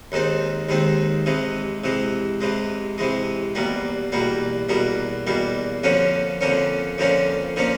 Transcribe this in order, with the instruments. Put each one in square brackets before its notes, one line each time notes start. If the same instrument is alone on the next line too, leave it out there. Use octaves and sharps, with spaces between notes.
[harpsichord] D#2 D#3 G#3 C4
D#2 D#3 G#3 C4
C3 E3 G#3
C3 E3 G#3
C3 E3 G#3
C3 E3 G#3
E2 B2 G3 A#3
E2 B2 G3 A#3
E2 B2 G3 A#3
E2 B2 G3 A#3
F2 D3 F3 A#3 C#4
F2 D3 F3 A#3 C#4
F2 D3 F3 A#3 C#4
D3 F3 A#3 C#4